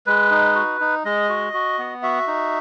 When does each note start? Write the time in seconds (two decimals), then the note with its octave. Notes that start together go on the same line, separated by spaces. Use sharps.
0.06 G#3 B4
0.30 D#4
0.55 F#4
0.81 D#4
1.05 G#3 D#5
1.29 F#4
1.54 F#4
1.79 B3
2.03 F#4 E5
2.27 D#4